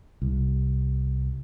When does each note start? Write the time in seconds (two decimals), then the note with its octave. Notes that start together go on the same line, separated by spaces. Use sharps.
0.22 C2